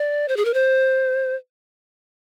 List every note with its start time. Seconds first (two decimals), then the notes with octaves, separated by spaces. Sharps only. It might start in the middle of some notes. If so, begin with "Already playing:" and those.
Already playing: D5
0.28 C5
0.37 G#4
0.45 A#4
0.54 C5